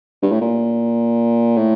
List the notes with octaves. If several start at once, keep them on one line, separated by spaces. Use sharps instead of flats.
G2
A2
A#2
A2